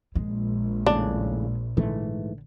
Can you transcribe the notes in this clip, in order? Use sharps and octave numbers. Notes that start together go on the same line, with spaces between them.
A#1 G#3
D#2 A2 C#3 D4
G#2 D3 E3 A3